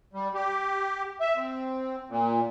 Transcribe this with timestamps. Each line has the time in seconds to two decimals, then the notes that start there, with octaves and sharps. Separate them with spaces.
0.13 G3
0.34 G4
1.21 E5
1.36 C4
2.09 A#2